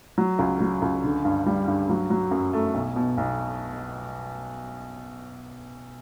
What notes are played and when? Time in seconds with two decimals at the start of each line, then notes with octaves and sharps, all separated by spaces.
0.18 F#3
0.39 C#2
0.60 F#3
0.82 C#2
1.04 D3
1.25 G2
1.46 G3
1.68 G2
1.89 F#3
2.10 F#3
2.31 F#2
2.53 A3
2.74 B1
2.96 B2
3.18 B1